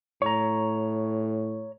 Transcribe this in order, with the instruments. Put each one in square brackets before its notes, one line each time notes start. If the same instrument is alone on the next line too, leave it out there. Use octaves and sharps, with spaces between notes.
[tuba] A2 [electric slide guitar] C#5 A#5